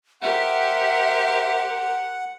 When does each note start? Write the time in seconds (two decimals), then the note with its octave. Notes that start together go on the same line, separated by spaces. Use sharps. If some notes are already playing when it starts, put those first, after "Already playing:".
0.22 G4 A#4 C5 E5 F#5